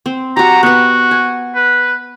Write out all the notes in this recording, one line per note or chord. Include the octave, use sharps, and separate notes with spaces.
C4
F#4 G4 A#5
B3 F#4 B4
G#5
B4